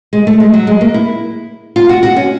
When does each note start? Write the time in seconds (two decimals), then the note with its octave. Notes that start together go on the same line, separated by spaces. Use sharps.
0.13 G#3
0.27 A3
0.40 G#3
0.54 F#3
0.67 G#3
0.81 A#3
0.94 E4
1.76 F4
1.89 F#4
2.03 F#4
2.16 C#4